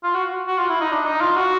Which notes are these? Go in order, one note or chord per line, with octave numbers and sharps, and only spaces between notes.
F4
F#4
F#4
F4
E4
D#4
D4
D#4
F4
F#4